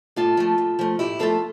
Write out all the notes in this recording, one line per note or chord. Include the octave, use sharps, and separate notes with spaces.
A2 F4 A4
F3 A3
A2
F3 A3
A2 E4 G4
F3 A3 F4 A4